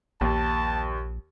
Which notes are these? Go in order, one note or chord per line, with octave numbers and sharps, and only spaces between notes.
A#1 D#2 A5